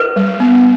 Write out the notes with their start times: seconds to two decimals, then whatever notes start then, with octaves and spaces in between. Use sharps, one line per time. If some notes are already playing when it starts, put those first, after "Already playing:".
Already playing: B4
0.16 G3
0.40 B3